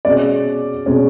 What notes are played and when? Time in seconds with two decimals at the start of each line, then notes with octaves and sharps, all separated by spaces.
0.05 B2 G#3 C#4 D5
0.86 B2 G#3 C#4